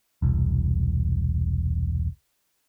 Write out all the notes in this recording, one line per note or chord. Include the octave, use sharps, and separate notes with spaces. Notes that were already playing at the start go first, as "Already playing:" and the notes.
E1 C2